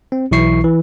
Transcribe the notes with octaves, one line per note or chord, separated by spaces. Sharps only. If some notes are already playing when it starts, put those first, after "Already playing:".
C4
B1 E3 E4 C#6 C7
E3